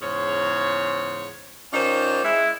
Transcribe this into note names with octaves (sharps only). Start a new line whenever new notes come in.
E2 G#2 C#3 C5 C#5
D#3 C#4 D#4 F4 C5 D5
G#3 E4